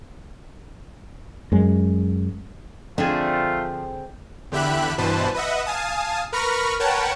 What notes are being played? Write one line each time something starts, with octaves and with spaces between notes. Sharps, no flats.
F#2 G#3
D3 F3 A3 C4 D4 F4 G#4
E2 D3 G4 E5 B5 F#6
G2 B2 E3 B4 C5 A5
B4 D#5 E5 F#5
F5 G#5 A5 D#6
A#4 B4 B5 C#6 F6 A#6
A#4 B4 C#5 F#5 G5 A5